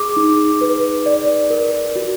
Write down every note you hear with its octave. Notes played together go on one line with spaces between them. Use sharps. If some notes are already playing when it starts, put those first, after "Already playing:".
Already playing: G#4 D6
D#4
B4
D5
A#4
F#4